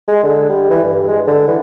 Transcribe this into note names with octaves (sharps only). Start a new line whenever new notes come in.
G#3
D3
G3
E3
G2
G#3
D3
E3